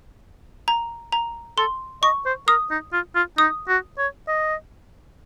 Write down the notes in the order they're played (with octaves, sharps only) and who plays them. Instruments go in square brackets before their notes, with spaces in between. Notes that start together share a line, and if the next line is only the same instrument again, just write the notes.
[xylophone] A#5
A#5
[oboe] A4 [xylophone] C6
[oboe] D#5 [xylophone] C#6
[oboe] C5
[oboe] A#4 [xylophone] D#6
[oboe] D#4
F4
F4
[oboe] D#4 [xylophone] D#6
[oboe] F#4
C#5
D#5